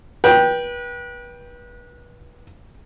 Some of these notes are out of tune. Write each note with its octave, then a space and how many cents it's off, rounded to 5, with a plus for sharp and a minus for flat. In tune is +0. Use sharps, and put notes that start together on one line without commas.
B4 -30 G5 +0